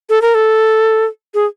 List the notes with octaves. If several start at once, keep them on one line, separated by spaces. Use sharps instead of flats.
A4
A#4
A4
G#4